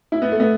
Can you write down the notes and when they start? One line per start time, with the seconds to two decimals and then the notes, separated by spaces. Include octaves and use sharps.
0.12 E4
0.22 B3
0.32 A3
0.40 B3